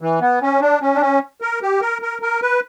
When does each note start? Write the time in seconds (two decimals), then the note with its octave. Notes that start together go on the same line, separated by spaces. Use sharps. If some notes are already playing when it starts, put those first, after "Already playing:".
0.01 E3
0.21 B3
0.42 C#4
0.61 D4
0.82 C#4
0.95 D4
1.01 C#4
1.41 A#4
1.62 G4
1.81 A#4
2.02 A#4
2.22 A#4
2.42 B4